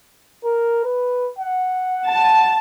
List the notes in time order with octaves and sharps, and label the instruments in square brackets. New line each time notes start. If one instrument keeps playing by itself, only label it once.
[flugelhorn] A#4
B4
F#5
[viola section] A5